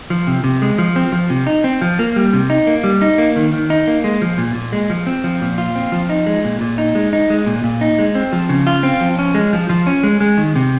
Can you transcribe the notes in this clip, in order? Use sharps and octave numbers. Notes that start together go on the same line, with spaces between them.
F3
C3
C3
G#3
F3
C4
F3
C3
D#4
C4
F3
A#3
G3
C3
D#4
A#3
G3
D#4
A#3
D#3
D#3
D#4
A#3
G#3
F3
A#2
A#2
G#3
F3
C4
F3
A#2
F4
C4
F3
D#4
G#3
A#2
A#2
D#4
G#3
D#4
G#3
A#2
A#2
D#4
G#3
C4
F3
C#3
F4
C4
F3
C#4
G#3
F3
F3
C#4
G#3
G#3
D#3
C3